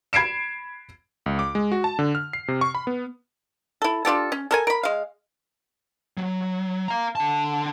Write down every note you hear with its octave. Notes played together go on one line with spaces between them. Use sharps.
B5 G#6 C7 D7 E7
C#2
D6
G#3
F#4
A5
D3
F6
C7
C3
C#6
B5
B3
E4 A4
D4 F4 G4 A4
C#4
A4 A#4 G#5
A#4 B5
G#3 F5
F#3
F5 A#5
D3 A5